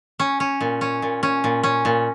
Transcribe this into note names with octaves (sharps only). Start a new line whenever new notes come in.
C#4
C#4
A#2
C#4
A#2
C#4
A#2
C#4
A#2